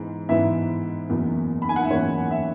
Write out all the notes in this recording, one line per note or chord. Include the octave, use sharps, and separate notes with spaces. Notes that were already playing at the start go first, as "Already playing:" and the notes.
Already playing: G#2 E3 B3
G#2 E3 B3 E4 E5
F#1 E2 B2
B5
G#5
F#5
E5
F#1 E2 B2 C#5
E5